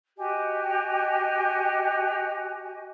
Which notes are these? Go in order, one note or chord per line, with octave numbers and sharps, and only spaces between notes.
F#4 G4 D#5 G#5